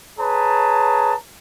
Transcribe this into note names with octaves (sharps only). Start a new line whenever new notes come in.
G#4 B4 C#5 A5 A#5